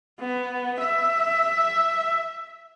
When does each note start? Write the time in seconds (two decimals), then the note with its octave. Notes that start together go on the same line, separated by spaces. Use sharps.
0.19 B3
0.79 E5